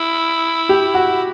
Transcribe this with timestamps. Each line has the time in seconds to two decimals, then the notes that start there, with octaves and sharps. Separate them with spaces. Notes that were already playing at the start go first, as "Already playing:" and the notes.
Already playing: E4
0.69 G4
0.94 F#4